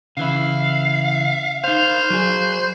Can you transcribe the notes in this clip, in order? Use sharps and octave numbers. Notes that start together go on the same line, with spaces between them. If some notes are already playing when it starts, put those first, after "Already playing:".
C#3 E3 E4 F5
D#4 C5 F5
F#3 G#4